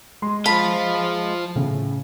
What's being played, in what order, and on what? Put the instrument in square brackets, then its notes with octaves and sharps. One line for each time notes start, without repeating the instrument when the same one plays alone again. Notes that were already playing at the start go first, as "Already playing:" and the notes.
[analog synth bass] G#3 [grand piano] C6
[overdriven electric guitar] F3 F4 [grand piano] A5 [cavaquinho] B5
[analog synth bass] A2 [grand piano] C#3